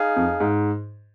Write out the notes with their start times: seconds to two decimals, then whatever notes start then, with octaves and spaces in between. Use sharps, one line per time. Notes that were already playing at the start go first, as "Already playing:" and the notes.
Already playing: D#4 G#4 F5
0.16 F2
0.40 G#2